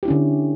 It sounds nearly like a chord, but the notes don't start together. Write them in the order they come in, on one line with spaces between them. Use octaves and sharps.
G4 E4 C#4 D3